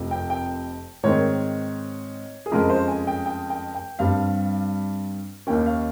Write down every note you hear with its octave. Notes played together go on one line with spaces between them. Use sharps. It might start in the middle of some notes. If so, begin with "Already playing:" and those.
Already playing: F1 F2 C3 F3
G5
G5
G#2 D#3 G#3 C4 C#5
G#4
F2 C#3 G#3 A#4
C5
G#5
G5
G5
G5
G5
G2 G3 C4 F5
D#2 D#3 A#3 C#4 G5
F5